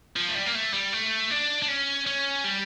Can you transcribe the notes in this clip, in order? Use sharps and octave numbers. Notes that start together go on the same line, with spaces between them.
F3
A3
G3
A#3
A3
G3
A3
D4
D4
C#4
C#4
G3